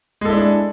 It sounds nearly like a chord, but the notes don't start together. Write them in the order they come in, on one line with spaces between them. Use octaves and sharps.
G#3 A4 E4 D4